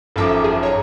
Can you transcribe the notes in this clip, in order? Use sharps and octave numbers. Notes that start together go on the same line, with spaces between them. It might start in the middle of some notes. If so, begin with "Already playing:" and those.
G#1 F#2 F3 A4 E5 D6
G#4
C#5 A#5